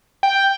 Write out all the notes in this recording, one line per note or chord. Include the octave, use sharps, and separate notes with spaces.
G5